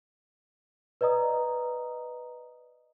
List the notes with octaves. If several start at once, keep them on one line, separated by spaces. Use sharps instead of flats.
B4 D5 D#5 A#5 D#6